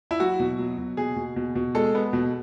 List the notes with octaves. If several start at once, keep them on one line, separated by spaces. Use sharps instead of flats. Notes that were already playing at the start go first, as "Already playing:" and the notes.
E4
F#3 F#4
B2
F#3
B2
B2 G#4
B2
B2
B2
G#3 A4
B3
B2